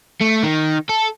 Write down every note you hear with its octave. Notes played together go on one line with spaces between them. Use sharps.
A3
D#3
A4